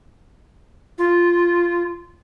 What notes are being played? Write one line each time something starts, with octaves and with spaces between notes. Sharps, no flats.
F4